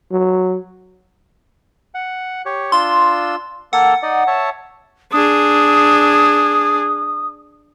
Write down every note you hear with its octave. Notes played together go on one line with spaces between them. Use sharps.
F#3
F#5
G4 C#5
D4 F4 C6 E6
A#3 A4 F#5
D#4 D5 D#5
C#5 E5 A5
D4 G#4 D#6